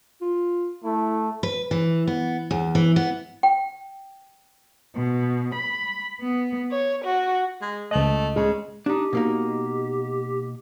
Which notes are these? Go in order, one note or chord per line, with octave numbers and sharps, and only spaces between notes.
F4
A3 E4
B4
E3
B3
E2
E3
B3
G5
B2
B5
B3
C#5
F#4
G#3
C#2 A3 D#5
C#3 G#3
D4 D#4 G4
B2 A#3 D#4